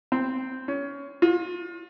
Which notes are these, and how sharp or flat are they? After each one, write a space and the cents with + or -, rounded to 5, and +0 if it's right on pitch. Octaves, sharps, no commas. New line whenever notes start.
C4 -5
C#4 +20
F4 +35